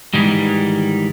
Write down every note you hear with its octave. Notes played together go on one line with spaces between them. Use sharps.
G#2 D#3 E3 G3